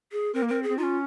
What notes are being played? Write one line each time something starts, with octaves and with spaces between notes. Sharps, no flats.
G#4
C4 A#4
A#3
C4 A#4
G#4
C4
D#4 F4
C#4